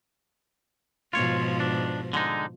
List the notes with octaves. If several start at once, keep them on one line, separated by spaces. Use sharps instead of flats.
G#2 B2 F3 F4 C#5
D4
D3 G#3 D#4